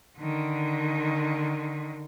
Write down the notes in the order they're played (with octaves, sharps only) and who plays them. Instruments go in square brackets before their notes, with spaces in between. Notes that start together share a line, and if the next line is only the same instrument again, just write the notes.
[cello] D3 D#3